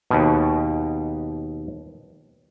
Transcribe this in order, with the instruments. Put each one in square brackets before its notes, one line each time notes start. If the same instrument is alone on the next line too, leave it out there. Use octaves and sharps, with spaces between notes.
[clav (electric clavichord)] D#2 B2